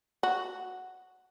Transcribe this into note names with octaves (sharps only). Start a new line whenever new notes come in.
F#4